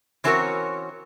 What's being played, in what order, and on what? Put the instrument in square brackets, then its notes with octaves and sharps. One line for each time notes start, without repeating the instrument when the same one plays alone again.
[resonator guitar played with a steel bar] E3 C4 C#4 F#4 A#4 C#5